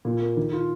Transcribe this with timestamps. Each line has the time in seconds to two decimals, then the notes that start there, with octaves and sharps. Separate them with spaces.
0.05 A#2
0.22 A#3
0.37 D#3
0.53 F4